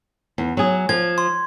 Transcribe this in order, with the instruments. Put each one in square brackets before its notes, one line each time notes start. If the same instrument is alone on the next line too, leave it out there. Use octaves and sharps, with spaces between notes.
[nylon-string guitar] E2
F#3 G#4
[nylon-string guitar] F3 [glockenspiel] G#6
[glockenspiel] C6